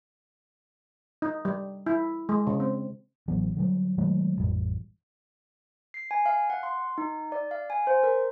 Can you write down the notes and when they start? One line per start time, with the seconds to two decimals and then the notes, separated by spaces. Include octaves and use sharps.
1.22 D#4
1.45 G3
1.86 E4
2.29 G#3
2.47 C#3
2.60 C4
3.28 A1 E3 F#3 B3
3.57 D3 F#3 G3
3.98 D#3 F#3 G#3 A3
4.37 A1 F2 G3
5.94 C7
6.11 G#5
6.26 F5
6.50 F#5
6.63 C6
6.98 D#4
7.32 D5
7.51 F5
7.70 G#5
7.87 C5
8.03 A#4